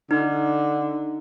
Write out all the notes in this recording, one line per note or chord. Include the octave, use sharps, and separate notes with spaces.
D3 D#4